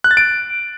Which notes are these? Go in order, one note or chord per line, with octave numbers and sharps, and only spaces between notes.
F#6
A6
D7